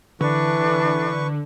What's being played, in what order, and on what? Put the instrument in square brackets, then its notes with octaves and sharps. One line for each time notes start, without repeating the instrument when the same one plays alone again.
[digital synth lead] D3 [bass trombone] E3 [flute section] D4 [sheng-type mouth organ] B4 C#6